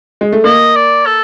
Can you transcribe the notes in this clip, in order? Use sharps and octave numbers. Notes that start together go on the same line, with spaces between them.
G#3
A3
A#3 D#5
D5
A4